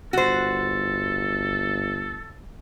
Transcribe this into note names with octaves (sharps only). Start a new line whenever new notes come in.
G1 F#4 A4 C5